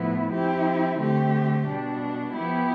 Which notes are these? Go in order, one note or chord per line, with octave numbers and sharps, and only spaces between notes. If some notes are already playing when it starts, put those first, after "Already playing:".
Already playing: A2 F3 B3 E4
F3 C4 E4 G4
D3 A3 C4 G4
B2 G3 D4
F3 B3 E4 G4